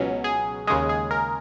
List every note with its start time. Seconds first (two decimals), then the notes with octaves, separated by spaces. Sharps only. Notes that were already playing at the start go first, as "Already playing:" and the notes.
Already playing: C#2 B2 F#3 C#4
0.24 G#4
0.67 D#2 C#3 G#3 G#4
0.89 G#4
1.11 A#4